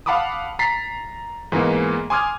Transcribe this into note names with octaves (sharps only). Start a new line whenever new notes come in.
F5 F#5 A5 B5 D6 D#6
A#5 A6 B6 C7
G#2 E3 G#3 A#3 B3
G#5 C6 D6 D#6 F6 G#6